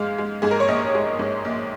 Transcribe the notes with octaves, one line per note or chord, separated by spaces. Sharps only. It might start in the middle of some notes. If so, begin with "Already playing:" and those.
Already playing: G#2 G#3 F5
G#3
G#2 G#4
A#4
C#5
A#1 D#5
G#3
G#2
A#1